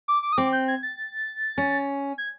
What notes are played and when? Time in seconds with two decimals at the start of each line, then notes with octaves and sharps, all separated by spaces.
0.08 D6
0.23 D6
0.33 D#6
0.38 C4 D6
0.53 G6
0.68 G#6
0.83 A6
1.58 C#4
2.18 G#6